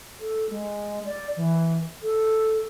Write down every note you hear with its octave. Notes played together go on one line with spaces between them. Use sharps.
A4
G#3
D5
E3
A4